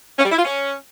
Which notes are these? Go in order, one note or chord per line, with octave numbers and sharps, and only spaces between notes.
C#4
G3
E4
F4
C#4